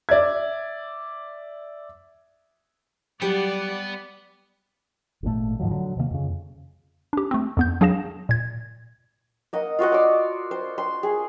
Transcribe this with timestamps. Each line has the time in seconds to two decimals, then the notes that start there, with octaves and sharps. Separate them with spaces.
0.09 D5 E5 G#6
3.22 F#3 G3 B3 G4 D5 F#5 C#7
5.23 G#1 A#2 C#3 A3
5.59 G#2 D#3 F3 F#3
5.71 D3 F#3
5.97 C3 D#3 G3 A#3
6.11 F2 C#3
7.13 D4 G4
7.31 A3 C4
7.57 F2 B3 G6
7.81 F#3 D4 G#4 F5 A#6 E7
8.29 A#2 G#6
9.53 A#3 D#5 F#5
9.79 F4 F#4 D#5 F#5
9.92 D5 D6
10.51 C5
10.78 C6
11.03 G#4